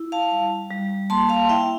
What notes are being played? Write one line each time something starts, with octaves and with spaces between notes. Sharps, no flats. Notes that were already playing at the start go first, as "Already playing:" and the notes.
Already playing: E4
F5 A5
G3
G3
A#3 A5 C6
F5 A5
E4 E5 G5